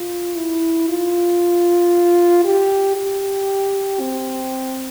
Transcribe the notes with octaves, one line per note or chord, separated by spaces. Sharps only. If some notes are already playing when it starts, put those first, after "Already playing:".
Already playing: F4
E4
F4
G4
G4
C4